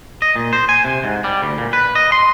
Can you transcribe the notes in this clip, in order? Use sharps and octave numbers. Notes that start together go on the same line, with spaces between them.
D#5
A#2
C5
G#5
C3
G#2
G3
D2
A#2
B4
D#5
C6